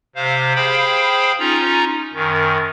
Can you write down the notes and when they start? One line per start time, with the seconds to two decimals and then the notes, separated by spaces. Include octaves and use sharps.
0.16 C3 C5 F5
0.55 G#4 C5 F5 G5 B5
1.39 C#4 D#4 F4 A#5
2.14 F#2 D#3